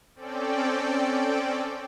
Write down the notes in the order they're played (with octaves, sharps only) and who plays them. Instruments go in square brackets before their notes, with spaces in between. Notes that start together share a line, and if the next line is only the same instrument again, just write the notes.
[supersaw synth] C4 C#4 A4 D5 G5